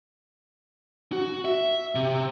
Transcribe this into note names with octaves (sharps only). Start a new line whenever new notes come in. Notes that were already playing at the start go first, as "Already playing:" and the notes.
F#4
E5
C3